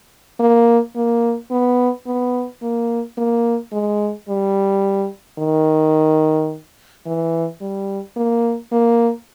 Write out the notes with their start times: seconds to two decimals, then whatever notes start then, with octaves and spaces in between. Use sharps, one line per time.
0.40 A#3
0.96 A#3
1.51 B3
2.07 B3
2.62 A#3
3.18 A#3
3.72 G#3
4.29 G3
5.39 D#3
7.06 E3
7.61 G3
8.16 A#3
8.72 A#3